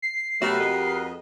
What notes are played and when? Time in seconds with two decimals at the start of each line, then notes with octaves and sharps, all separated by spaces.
0.02 C7
0.42 B2 F#3 A3 F#4 G4 A#4 B4
0.60 F2 G#3 D#5